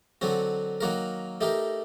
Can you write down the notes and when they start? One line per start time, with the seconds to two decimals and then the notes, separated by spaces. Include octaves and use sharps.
0.21 D3 F#3 C4 F#4
0.81 D#3 F#3 A#3 F#4 A#4
1.41 A3 D#4 G4 A#4